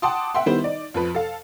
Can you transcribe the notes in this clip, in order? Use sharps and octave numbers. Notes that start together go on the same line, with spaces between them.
F#5 G5 A5 C6 D6 D#6
E5 F#5 G5 C6
D#3 G3 B3 E4 C5
D#4 D5
F2 F3 B4
A4 F5